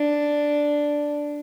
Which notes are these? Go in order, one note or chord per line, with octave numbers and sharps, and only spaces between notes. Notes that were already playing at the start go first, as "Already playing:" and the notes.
Already playing: D4